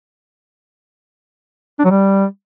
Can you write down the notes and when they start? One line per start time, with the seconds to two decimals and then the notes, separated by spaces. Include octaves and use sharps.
1.79 D4
1.85 F#3
1.91 G3